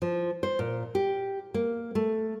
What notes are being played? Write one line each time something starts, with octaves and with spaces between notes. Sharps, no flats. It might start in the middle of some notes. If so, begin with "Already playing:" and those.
F3
C5
A#2
G4
A#3
A3